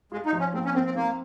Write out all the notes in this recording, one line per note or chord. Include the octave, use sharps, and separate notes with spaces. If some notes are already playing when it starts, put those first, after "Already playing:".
G#3 F4
D#4
F3
C#4
A#3 C4
C#4
C4 A#4
C4
A#3 C4